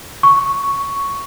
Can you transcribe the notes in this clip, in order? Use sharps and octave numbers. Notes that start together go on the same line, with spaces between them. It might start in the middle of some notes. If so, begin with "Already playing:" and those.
C#6